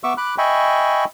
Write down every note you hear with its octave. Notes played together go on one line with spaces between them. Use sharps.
B3 E5 C#6 D6 E6
B5 D6 F#6
D#5 E5 G5 G#5 B5 C#6